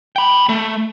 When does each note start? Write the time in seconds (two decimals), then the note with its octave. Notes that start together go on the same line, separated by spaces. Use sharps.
0.16 G5 B5
0.49 A3